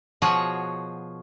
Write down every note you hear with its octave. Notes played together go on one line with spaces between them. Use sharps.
B2 F3 F#4 G#4 C#5 F#5